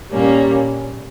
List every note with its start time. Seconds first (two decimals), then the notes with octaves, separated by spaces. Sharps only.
0.11 A#2 G3 A#3 C#4